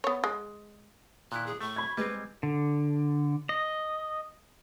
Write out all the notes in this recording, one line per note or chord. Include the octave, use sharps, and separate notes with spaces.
B3 C#5
G#3
A#2 D#3 E4 F#6
G#4
A2 A3 C#6
B5 G#6
G3 G#3 C4 B4
D3
D#5